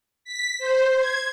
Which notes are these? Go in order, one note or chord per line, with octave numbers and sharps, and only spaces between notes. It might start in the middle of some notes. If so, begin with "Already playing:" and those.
B6
C5
G#6